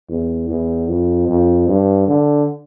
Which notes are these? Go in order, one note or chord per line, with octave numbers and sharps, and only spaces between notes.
E2
E2
F2
F2
G2
D3